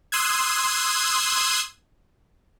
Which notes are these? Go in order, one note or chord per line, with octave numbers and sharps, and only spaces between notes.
C6 D#6 E6 F#6 G#6